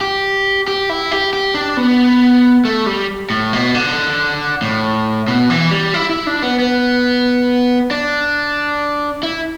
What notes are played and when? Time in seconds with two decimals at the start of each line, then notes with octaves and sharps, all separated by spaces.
0.01 G4
0.68 G4
0.89 E4
1.11 G4
1.33 G4
1.54 D4
1.77 B3
2.65 A3
2.86 G3
3.30 A2
3.53 B2
3.75 D3
4.62 A2
5.28 B2
5.50 E3
5.71 G3
5.94 E4
6.10 E4
6.27 D4
6.43 B3
6.59 B3
7.91 D4
9.23 E4